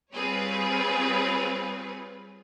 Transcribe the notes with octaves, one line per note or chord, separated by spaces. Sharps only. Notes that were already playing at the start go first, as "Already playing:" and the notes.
G3 C4 F4 G#4 B4 C#5